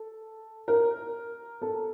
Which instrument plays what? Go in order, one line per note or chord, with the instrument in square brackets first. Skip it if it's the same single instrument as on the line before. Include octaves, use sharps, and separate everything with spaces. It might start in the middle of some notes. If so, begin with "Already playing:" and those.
Already playing: [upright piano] A4
A#4
A4